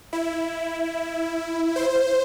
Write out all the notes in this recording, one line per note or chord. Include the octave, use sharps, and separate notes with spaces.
E4
C5